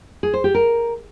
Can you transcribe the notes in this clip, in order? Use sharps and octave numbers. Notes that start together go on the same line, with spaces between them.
G#4
C5
G4
A#4